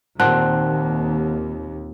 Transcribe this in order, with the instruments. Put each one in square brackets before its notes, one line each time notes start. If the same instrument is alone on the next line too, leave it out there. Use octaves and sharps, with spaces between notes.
[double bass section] D#2 [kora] A#2 C4 [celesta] F#5 A5 F#6